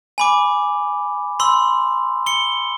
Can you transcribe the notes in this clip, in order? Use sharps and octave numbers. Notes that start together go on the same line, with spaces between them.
G#5 B5 D6
B5 C6 E6
C#7 G7